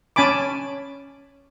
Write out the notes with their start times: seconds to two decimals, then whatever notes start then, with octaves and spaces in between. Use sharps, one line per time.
0.16 C#4 G#5 A5 B5 D6